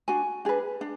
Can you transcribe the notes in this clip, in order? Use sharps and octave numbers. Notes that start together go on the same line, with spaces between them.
D4 F#4 G#5
D4 G#4 B4
D4